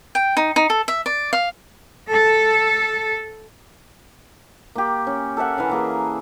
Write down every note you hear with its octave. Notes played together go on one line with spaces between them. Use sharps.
G5
D#4
D#4
A4
E5
D5
F5
A4
A#3 G4
C#4
A4 A#4 E5 F#5
E3 E4 E5 F5
E3 A#3 G#4